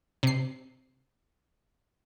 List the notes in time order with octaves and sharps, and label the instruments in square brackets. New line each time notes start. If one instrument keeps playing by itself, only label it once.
[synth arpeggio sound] C3 C7